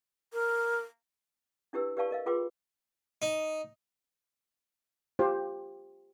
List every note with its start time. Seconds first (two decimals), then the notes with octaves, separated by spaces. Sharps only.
0.33 A#4
1.73 D4 E4 G4 B4 E6
1.97 G4 B4 D5 F5 A5 C#6
2.11 A#4 D#5 F5
2.26 F4 G#4 B4 G5 C6 D6
3.22 D#4
5.19 F4 G4 C5